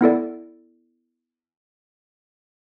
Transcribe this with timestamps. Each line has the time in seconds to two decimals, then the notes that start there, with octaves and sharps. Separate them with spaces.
0.01 B3 E4 A4 D5